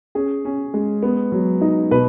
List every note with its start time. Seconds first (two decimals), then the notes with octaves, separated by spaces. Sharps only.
0.15 C#4 G#4
0.45 C#4
0.74 G#3
1.03 B3
1.32 F#3
1.61 D#4
1.91 B2 B4